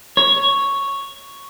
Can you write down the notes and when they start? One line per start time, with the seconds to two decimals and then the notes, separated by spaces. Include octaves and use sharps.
0.17 C#5